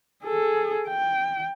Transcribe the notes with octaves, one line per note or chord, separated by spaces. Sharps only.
G#4 A4
G5